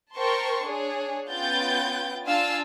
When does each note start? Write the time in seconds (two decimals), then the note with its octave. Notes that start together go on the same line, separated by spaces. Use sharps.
0.16 A#4 C5 G5 A5 C6 C#6
0.65 D4 G#4 C#5
1.29 B3 C#4 F4 G5 G6 A6
2.24 D4 F4 F5 G#5 A5 E6